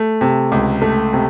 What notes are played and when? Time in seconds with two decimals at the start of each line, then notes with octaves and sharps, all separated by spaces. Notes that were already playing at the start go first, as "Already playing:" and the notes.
Already playing: A3
0.21 C3
0.52 C#2
0.82 A3
1.13 C3